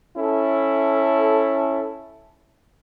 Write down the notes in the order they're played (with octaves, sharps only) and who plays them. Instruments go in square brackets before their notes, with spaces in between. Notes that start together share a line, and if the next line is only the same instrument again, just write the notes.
[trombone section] C#4 E4 A4